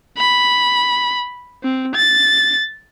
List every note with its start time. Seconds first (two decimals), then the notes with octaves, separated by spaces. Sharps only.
0.18 B5
1.63 C4
1.95 A6